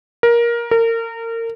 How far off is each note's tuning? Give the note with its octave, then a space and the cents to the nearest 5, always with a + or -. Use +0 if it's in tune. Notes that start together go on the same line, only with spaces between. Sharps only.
A#4 +15
A#4 -30